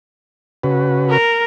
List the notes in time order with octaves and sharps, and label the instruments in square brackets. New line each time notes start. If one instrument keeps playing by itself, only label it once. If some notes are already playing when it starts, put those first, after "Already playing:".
[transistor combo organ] C#3 F#4 B4
[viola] A#4